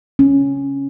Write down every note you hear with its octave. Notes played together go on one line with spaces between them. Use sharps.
C#4